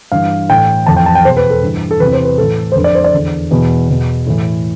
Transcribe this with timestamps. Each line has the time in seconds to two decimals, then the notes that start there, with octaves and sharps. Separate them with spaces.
0.12 G2 E3 F5
0.49 A2 E3 G5
0.86 F2 E3 A5
0.97 G5
1.06 A5
1.15 G5
1.25 E2 B2 C5
1.37 B4
1.50 A4
1.63 G2 E3
1.91 A4
2.00 E2 C3 E3 B4
2.13 C5
2.25 B4
2.38 A2 E3 A4
2.72 C5
2.75 F2 D3 B4
2.84 D5
2.95 C5
3.04 D5
3.14 E2 D3
3.51 E2 B2
3.89 E2 B2
4.26 A2 E3